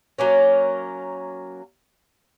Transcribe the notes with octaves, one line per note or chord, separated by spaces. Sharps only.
F#3 A#3 C#4